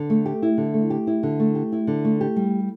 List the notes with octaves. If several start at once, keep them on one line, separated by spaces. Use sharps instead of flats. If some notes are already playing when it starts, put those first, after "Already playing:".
Already playing: D3
A3
G4
E4
D3
A3
G4
E4
D3
A3
G4
E4
D3
A3
G4
G3